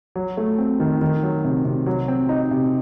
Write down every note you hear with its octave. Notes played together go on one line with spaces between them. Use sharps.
F#3
A3
C4
D#3
D#3
F#3
C3
C3
F#3
C4
D#4
C3